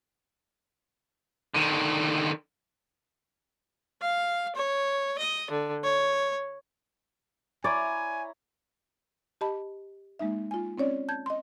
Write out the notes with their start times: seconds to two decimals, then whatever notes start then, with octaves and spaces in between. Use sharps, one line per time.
1.54 D3 D#3
4.02 F5
4.56 C#5
5.18 D#5
5.51 D3
5.84 C#5
7.64 E4 C#5 D5 G#5 A#5
9.41 G4 D#5 A5 B5
10.19 G#3 A#3 D#4 E5
10.51 F4 G#5
10.78 C4 C#4 C#5 D5
11.09 A5 G6 G#6
11.26 D#5 C6